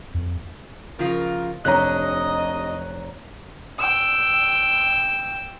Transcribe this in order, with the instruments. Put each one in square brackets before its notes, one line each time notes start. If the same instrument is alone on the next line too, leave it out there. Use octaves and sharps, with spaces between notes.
[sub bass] F2
[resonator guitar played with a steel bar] C#3 F3 F4 [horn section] A#4
[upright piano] F1 C#5 A#5 [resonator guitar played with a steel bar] C3 D4 [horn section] D#5 [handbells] F#6
[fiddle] G5 E6